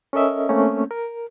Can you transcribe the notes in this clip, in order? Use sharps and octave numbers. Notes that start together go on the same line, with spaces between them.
C#4 A4 A#4 D#5 E5
A3 A#3 C4 C#4
A#4